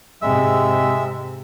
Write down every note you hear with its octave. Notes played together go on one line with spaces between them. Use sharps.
G#2 C3 G#3 E5 E6